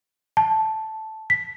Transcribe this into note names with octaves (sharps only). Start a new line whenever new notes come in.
A5
B6